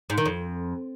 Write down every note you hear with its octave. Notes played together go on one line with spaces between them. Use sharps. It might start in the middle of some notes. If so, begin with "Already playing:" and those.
G#2
D#3
F2